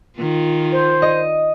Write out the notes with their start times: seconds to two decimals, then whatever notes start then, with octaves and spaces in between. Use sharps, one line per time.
0.19 D#3 F4
0.72 C5
1.02 D#5